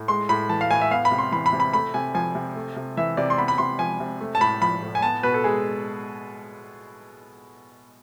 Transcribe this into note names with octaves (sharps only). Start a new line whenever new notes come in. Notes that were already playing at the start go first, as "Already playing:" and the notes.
Already playing: A2
G#3 C6
A2 B5
E3 A5
F5
A2 G#5
E5
B3 F5
B5
C3
C6
E3 B5
B5
C3
B5
A3 B5
C3 G#5
F3 G#5
C3
A3
C3
E3 E5
C3 D5
C6
B3 B5
B5
C3 C6
F3 G#5
C3
A3
A5
A2 B5
F3 B5
A2
G#5
B3 A5
B2 B4
A4
G#3 G#4